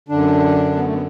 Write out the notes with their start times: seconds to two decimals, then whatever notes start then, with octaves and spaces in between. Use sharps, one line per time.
0.08 F#2 D3 D4
0.76 B3
0.85 A3
0.93 B3